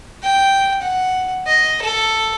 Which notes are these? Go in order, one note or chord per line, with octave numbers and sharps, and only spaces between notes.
G5
F#5
D#5
A4